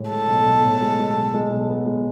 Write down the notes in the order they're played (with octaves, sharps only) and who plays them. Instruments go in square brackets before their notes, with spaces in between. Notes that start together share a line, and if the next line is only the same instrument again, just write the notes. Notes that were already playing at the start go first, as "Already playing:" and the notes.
Already playing: [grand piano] A2 G#3
[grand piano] G#3 [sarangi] A4
[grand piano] B1
B1
A2
G#3
G#3
B1
G#3
B1
B3
G#3